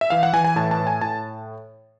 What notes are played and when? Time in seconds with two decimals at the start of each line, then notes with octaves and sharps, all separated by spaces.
0.01 E5
0.10 E3 F5
0.23 F#5
0.33 E3 G#5
0.44 G#5
0.56 A2 A5
0.71 A5
0.80 A2
0.87 G#5
1.01 A2 A5